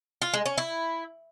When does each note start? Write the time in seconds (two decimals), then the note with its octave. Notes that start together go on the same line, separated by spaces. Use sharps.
0.22 F4
0.34 G#3
0.46 C#4
0.58 E4